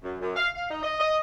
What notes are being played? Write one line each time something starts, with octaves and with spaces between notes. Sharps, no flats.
F#2
F#2
F5
F5
D#4
D#5
D#5